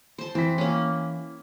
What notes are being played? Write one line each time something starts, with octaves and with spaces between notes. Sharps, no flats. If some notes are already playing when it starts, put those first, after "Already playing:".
C5 A5
E3 C4 B6
A#3 C#4